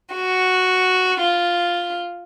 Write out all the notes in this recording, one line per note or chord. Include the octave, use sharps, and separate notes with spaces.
F#4
F4